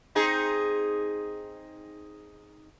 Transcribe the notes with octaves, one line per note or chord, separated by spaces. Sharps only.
C4 D#4 G#4